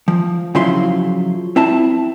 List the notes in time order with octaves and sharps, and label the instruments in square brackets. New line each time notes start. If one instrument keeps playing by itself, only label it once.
[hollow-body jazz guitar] F3
C#3 F3 F#3 E4 C6
C4 E4 A5